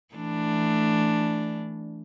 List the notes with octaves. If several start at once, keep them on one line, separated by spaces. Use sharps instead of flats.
E3 A3 D4